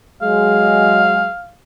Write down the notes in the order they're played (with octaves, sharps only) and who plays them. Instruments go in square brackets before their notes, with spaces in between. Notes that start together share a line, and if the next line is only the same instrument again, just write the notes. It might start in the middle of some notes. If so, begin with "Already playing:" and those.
[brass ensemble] F#3 G#3 [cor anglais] F5